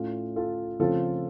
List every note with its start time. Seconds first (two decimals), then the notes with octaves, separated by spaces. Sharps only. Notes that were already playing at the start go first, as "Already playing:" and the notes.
Already playing: A2 A3 C#4 F4
0.36 F4 A4
0.79 C#3 F3 A3 C4 F4 A4